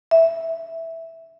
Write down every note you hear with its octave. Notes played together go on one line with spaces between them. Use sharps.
E5